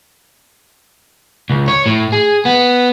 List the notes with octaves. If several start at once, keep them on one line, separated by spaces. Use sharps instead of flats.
C#2
C#5
A2
G#4
B3